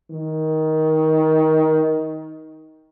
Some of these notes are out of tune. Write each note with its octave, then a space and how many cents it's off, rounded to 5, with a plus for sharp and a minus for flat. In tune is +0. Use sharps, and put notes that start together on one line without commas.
D#3 +15